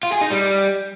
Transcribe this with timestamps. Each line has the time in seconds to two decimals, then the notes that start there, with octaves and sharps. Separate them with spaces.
0.03 F4
0.12 G#4
0.21 D#4
0.30 G3